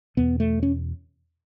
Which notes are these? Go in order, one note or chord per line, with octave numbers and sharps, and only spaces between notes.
E2 B2 B3
A3
C#4